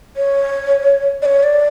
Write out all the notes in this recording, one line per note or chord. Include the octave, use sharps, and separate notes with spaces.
C#5
D5
C#5
D5